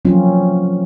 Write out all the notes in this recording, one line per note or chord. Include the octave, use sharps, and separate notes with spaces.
F3 F#3 A#3 C4 C#4 F4